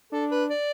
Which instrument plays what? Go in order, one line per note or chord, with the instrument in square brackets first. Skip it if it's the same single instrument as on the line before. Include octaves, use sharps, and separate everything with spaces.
[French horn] D4 [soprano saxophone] A4
[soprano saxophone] B4
D5